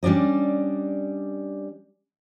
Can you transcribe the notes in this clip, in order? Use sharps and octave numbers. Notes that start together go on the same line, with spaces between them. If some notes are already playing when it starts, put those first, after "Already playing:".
G3 C#4 D4 D5 D#5